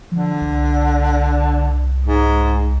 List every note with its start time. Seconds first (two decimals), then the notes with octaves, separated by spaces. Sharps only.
0.12 D3 F3
0.41 C2
2.04 G#2